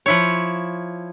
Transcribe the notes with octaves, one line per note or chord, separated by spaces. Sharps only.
F3 E4 C#5